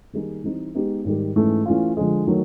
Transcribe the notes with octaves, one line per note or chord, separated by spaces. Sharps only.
D#3 G3 A#3 D#4 G#4
E3 G3 C4 D#4
G#3 B3 D#4 G4
G#2 D#3 G3
G#2 E3 A3 C#4
E3 A3 C#4 F4
D3 F3 G#3
D#3 F#3 A3